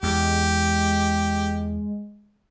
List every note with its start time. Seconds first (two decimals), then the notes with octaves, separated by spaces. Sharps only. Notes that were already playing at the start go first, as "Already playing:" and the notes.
0.03 E2 G#3 G4